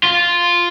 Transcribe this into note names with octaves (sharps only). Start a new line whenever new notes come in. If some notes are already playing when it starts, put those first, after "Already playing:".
F4